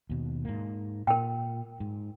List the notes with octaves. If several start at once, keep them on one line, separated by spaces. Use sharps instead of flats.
D#2 B2
G#2 A#3
A#2 A#4 G5
G#2